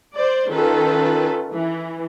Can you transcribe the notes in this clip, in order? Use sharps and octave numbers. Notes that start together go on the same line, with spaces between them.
C5 D5
D#3 C#4 F4 A4 B4
E3